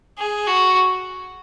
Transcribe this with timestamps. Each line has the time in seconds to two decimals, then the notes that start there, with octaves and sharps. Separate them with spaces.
0.18 G#4
0.47 F#4